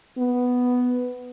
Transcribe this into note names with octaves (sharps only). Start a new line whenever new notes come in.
B3